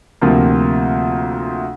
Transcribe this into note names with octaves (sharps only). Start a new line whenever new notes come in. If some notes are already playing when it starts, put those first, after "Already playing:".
D2 C3 F3 A#3 F4